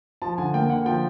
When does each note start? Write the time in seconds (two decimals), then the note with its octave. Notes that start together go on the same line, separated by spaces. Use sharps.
0.22 F3 A5
0.38 D3 G#5
0.54 A#3 G5
0.70 D3 F#5
0.86 F3 G5